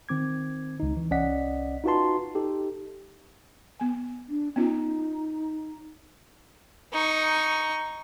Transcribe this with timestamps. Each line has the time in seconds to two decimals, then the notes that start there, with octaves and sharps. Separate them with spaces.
0.09 D#3 C4 D6 G#6
0.80 C#2 D#4
0.97 E3
1.11 C2 C#4 D5 D#5 F#5 B6
1.84 D#4 F4 F#4 B4 A5 C6
2.35 D#4 G4 A4
3.80 B3 G#5
4.29 D4
4.56 B3 C#4 D#4 F4
6.93 D#4 C#6